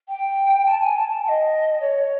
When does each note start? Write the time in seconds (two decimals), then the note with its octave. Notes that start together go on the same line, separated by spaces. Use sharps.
0.09 G5
0.66 A5
0.80 G#5
0.95 A5
1.09 A5
1.24 G5
1.28 D#5
1.81 C#5